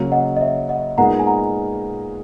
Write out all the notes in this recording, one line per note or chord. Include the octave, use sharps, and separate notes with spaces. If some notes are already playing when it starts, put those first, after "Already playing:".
Already playing: C#3 F#3 A#3
D#5 F#5
D#5
C#5 E5
D#5 F#5
A#2 G#3 B3 D#4 A#4 F#5 A#5
G#5
F#5 A#5